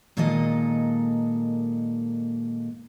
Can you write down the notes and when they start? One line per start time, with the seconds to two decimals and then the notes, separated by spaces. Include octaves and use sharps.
0.17 A#2 D#3 G#3 A#3 A4 D#5